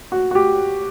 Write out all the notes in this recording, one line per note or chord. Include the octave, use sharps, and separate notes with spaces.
F#4
F#4
G4